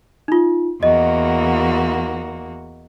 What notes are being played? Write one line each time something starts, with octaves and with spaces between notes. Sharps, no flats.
D#4 F4
E2 A#3 F#4 D#5